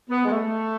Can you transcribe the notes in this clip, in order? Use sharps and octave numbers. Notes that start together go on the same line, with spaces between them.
B3
G#3
A3